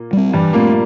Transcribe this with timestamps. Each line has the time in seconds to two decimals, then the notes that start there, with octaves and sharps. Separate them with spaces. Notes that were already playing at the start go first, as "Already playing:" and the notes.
Already playing: A#2 A#3
0.13 G3 C4
0.33 G2 E3 G3
0.53 A#2 A3 A#3 C4